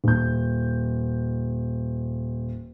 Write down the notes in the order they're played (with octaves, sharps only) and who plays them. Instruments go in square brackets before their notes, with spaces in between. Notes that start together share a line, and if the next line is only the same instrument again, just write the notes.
[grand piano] D#1 G6